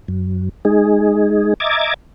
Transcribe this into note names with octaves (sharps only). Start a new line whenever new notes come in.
F#2
G#3 D#4 G#4
D#5 E5 A#5 D6 G#6 A6